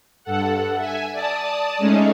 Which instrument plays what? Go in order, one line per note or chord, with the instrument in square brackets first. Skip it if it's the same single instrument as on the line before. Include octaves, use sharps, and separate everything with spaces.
[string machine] G2 A4 F#5
E5 G#5
D5 A5 D#6
G#3 A3 C#4 D#4 G#4